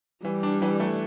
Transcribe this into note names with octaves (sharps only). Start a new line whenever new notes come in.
E3 G3
D4
E3
A3